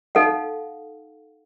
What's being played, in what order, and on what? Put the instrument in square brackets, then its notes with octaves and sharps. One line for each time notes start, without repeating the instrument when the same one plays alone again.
[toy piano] D#4 A4 F5 F#5